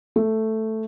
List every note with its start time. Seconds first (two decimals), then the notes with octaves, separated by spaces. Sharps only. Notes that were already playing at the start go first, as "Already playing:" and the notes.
0.16 A3